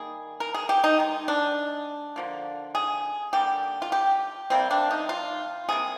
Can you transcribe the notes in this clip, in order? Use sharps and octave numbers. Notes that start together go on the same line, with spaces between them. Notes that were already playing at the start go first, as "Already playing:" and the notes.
Already playing: D#3 G3 A#3 G#4
A#4
G#4
G4
D#4
D#3 G#3
D4
D3 F3 A#3
G#4
D3 G3 A#3 G4
F4
G4
C3 G3 A#3 C4
D4
D#4
F4
C3 G3 A#3 G#4